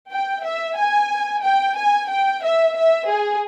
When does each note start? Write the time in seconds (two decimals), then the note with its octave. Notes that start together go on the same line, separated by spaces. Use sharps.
0.11 G5
0.45 E5
0.78 G#5
1.44 G5
1.77 G#5
2.09 G5
2.43 E5
2.76 E5
3.09 G#4